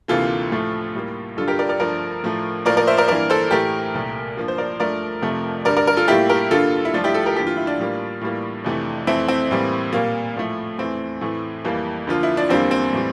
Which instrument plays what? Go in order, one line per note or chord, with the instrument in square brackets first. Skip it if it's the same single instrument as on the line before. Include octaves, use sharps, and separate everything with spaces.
[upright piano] D2 C3 E3 A#3 F4 A4
A2 F3 A3
A2 G3 A#3
G2 D3 G3 F4 A4
G4 A#4
A#4 D5
A#4 D5
G2 F3 A3 A#4 D5
A2 F3 A3
A2 F3 A#3 A#4 D5
A#4 D5
C5 E5
A#4 D5
G2 E3 A#3 A#4 D5
A4 C5
A2 E3 A3 G4 A#4
C2 A#2 A3
G2 F3 A#3
C5
A#4 D5
G2 F3 A3 A#4 D5
F2 C3 F3 A3
G2 D3 G3 A#4 D5
A#4 D5
A#4
F4 A4
A2 G3 A#3 E4 G4
G4 A#4
G2 D3 G3 A#3 F4 A4
E4
G2 F3 A3 D4 F4
E4 G4
F4 A4
G4 A#4
G2 E3 A#3 G4
F4
E4
D4 F4
A2 G3 A#3
A2 E3 G3 A#3
F2 C3 E3 A3
F2 E3 A3 C4 E4
C4
A2 E3 G3 A#3
A#2 G3 A#3
A2 F3 A3
E2 E3 A3 C4
A2 E3 A3
F2 E3 G3 A#3
D2 D3 F3 A#3 F4
E4
D4
E2 D3 G3 A#3 C4
C4
A2 E3 G3